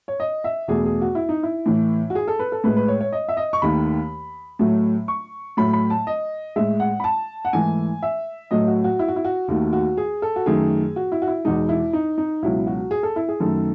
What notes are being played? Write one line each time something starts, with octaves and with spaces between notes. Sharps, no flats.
C#5
D#5
E5
E2 B2 A3 G#4
G#4
F#4
E4
D#4
E4
A2 E3 A3
F#4
G#4
A4
B4
A4
A2 G#3 B4
B4
C#5
C#5
D#5
E5
D#5
C#6
D#2 D#3 A3 B5
A2 F#3 A3
C#6
A2 F#3 A3 B5
B5
A5
D#5
A2 G#3 E5
F#5
B5
A5
F#5
G#2 E3 A3 G#5
E5
A2 F#3 A3 D#5
F#4
F#4
E4
F#4
E4
F#4
D#2 D#3 A3 F#4
F#4
G#4
A4
F#4
F#2 D#3 A3 G#4
F#4
E4
F#4
E4
E2 B2 G#3 D#4
E4
D#4
D#4
C#2 B2 F#3 E4
F#4
G#4
A4
E4
G#4
F#2 D#3 A3 A4